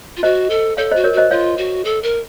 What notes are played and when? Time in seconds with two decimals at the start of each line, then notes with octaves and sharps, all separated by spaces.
0.17 F4
0.23 F#4 C5 D#5
0.50 A4
0.77 A4 C#5 F5
0.91 F#4 C5 D#5
1.04 A#4 C#5
1.13 F#4 C5 D#5
1.31 F4 C#5 F5
1.58 F#4
1.85 A4
2.03 A#4